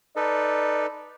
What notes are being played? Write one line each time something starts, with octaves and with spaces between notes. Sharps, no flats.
D#4 A4 B4 D5